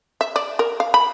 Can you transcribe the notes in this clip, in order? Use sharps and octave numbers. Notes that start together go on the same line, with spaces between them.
E5
D5
A#4
F5
B5